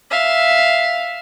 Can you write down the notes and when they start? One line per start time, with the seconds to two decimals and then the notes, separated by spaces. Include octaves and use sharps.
0.11 E5 F5